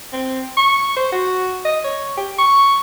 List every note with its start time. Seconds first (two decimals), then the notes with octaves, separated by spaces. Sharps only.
0.13 C4
0.57 C#6
0.96 C5
1.12 F#4
1.65 D#5
1.84 C#5
2.17 G4
2.38 C#6